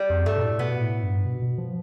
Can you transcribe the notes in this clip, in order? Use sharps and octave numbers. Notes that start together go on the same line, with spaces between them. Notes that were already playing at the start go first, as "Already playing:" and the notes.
Already playing: G3
F2
G2 A3
B2
A2
B2 B3
A2
G2
B2
B2
F3